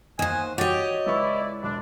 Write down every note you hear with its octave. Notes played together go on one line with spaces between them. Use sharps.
D#2 C5 D#5 F#5 G#5
F#4 G4 C#5 D#5 A6
C#2 E4 B4 D5 C#6
E1 D4